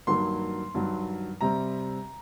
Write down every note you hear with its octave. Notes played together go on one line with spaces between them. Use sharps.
G2 D#3 F#3 A#3 C6
G2 D#3 F#3
C3 G3 C4 A#5